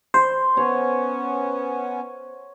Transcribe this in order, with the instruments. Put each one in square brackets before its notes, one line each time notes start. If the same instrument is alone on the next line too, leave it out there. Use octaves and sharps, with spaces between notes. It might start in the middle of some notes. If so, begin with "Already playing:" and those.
[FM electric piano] C5 [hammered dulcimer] C6
[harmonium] B3 C#4 [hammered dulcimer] C#5